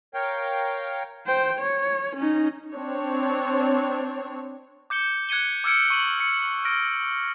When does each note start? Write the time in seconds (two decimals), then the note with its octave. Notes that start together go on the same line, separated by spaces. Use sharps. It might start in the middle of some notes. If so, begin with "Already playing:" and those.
0.14 A#4 C#5 F5 G5
1.26 C5 G5
1.59 C#5
2.15 C#4 D#4
2.72 C4 D4 C#5
4.90 D6 G6 C#7 G7
5.29 F#6 G#6 C#7 D#7 G7
5.64 D6 E6 F6 G#6 C#7 D7
5.90 C#6 D#7 F#7
6.19 E6 C#7
6.65 F6 A#6 D7